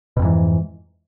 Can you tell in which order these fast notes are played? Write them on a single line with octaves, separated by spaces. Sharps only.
B2 F2 G#2 E3